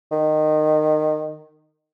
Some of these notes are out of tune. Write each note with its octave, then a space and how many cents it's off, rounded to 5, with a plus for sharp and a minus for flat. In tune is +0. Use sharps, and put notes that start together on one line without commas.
D#3 -20